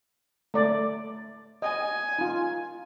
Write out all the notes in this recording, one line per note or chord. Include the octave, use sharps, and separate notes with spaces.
A3 D5
D#5 G#5
D#4 F4